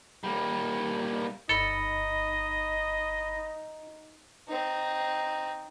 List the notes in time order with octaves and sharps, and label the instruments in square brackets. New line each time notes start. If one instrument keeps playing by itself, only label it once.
[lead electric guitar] G3 A#3
[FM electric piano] G1 B5 [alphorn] D#4 [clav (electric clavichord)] A4 [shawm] D#5
[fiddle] C4 D#4